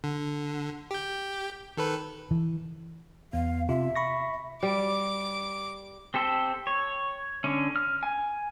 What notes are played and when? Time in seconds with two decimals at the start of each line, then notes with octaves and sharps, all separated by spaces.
0.04 D3
0.91 G4 G6
1.77 D#3 A4 B4
2.31 E3
3.33 E2 B3 F5
3.69 C3 F4 E5
3.96 B5 C#6 A#6
4.63 G3 D6
6.14 C4 G4 A4 C5
6.67 C#5
7.44 D3 C#4
7.76 F6
8.03 G#5